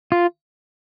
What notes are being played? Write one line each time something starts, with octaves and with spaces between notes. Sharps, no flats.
F4